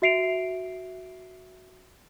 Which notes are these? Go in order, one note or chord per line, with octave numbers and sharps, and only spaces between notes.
F#4 E5 C7 D7 F7